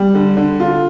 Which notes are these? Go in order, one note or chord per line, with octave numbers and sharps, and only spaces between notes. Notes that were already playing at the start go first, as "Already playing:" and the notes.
Already playing: G3
D3
D3
F4